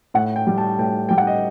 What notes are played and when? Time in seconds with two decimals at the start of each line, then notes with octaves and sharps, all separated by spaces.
0.14 A2 F#5
0.36 G5
0.47 G3
0.58 A5
0.79 A2 G5
1.09 G3 G5
1.18 F#5
1.27 D#5